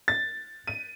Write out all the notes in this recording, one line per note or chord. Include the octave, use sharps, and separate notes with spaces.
A6
D#7